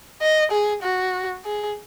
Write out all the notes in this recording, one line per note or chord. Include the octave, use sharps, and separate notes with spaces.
D#5
G#4
F#4
G#4